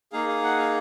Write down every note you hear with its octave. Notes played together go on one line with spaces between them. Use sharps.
A#3 D#4 G#4 F5
F5
F#5
F5